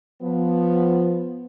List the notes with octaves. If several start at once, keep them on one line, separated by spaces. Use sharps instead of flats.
F3 B3